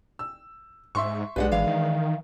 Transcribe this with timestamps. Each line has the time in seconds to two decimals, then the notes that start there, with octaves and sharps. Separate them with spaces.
0.19 E6
0.95 G#2 E5 C6 C#6
1.36 B1 G#3 D4 G4 B4 F5 F#5
1.52 G#1 E3 F5
1.67 D#3